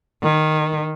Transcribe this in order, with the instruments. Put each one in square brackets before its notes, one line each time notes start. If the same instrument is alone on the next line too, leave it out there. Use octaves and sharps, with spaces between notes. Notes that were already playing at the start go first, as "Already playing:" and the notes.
[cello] D#3